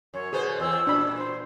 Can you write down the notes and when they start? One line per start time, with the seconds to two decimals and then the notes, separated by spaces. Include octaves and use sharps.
0.14 F#2 C#5
0.33 B2 B3 G#4 C5
0.60 E2 C4 E6
0.87 A#2 D4 B5
1.17 C5